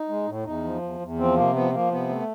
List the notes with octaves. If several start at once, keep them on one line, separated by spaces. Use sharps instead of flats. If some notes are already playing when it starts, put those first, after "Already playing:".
Already playing: D#4
G#3
A2
E2 D#4
F3
E2
E2
F3 C4
C3 A#3
F3 B3
F3 A#3
C3 B3
A3